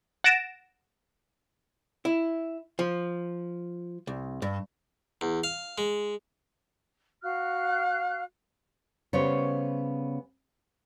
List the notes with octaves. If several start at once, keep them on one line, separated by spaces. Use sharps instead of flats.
F#5 A6 A#6 D7 E7
E4
F3
C2
G2
E2
F5
G#3
F#4 F5 F6 F#6
C#3 G3 B3 C5 C#5